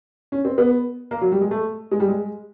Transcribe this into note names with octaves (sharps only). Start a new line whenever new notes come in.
C#4
C4
B3
A#3
F#3
G3
G#3
A3
G#3
G3
G#3